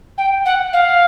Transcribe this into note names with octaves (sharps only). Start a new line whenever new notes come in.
G5
F#5
F5